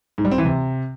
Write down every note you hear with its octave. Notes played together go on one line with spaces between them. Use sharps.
G#2
G3
C4
E3
C3